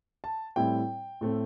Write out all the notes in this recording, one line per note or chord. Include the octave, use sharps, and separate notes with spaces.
A5
A2 G3 C4 E4 G5
A2 A3 C4